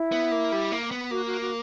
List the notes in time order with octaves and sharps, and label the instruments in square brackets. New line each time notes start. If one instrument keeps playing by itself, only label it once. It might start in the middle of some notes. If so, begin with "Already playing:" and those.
Already playing: [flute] E4
[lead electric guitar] B3
A#3
G3
A#3
B3
[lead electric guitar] A#3 [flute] F#4
[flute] F#4
F#4